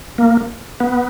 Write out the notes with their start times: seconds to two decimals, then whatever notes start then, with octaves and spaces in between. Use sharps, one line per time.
0.18 A#3
0.80 B3